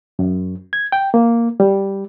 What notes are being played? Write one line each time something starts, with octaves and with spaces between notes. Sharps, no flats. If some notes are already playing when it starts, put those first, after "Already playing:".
F#2
G#6
G5
A#3
G3